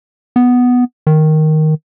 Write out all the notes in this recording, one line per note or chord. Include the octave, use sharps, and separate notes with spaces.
B3
D#3